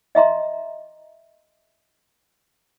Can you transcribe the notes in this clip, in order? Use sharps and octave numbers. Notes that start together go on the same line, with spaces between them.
D#5 E5 A#5 C6